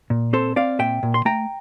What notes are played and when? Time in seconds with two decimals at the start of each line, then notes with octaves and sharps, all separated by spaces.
0.10 A#2
0.33 C4 A4 C5
0.56 C4 D5 F5
0.79 A#2 E5 G5
1.03 A#2
1.14 C6
1.25 A3 G5 A#5